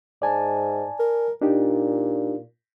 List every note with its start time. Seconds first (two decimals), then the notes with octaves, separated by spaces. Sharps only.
0.22 G#2 D5 G#5 A5
0.99 A#4
1.42 A#2 D4 D#4 G4